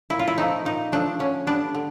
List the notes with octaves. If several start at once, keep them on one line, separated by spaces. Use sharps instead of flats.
A#2 E4
F4
E4
F3 A3 C4 D#4
A#2 D#4
F3 A3 C4 D4
D3 C#4
G3 B3 D4
D3